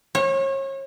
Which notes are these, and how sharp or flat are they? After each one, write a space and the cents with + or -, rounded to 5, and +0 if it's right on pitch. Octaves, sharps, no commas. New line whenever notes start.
C#5 -35